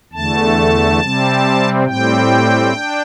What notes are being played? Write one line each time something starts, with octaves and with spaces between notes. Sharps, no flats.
E2 D3 A3 A5
C3 G3 C4
A2 G3 C4 G5
D4